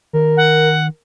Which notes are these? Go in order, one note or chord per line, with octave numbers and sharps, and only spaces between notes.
D#3 A#4
F#5